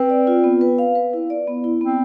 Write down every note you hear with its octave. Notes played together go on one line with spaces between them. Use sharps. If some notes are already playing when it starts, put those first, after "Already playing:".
Already playing: C4 B4
D5
F4
B3
B4
F5
B4
E4
D5
B3
E4
B3 C4